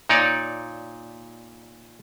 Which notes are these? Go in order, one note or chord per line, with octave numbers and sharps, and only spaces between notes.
A#2 D#4 C#5 D5